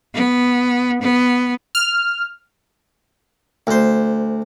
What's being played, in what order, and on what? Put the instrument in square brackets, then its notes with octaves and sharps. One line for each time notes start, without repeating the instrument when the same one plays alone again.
[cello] B3
B3
[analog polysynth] F6
[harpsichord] D2 C5